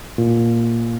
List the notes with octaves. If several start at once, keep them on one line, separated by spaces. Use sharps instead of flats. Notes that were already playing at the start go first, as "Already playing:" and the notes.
A#2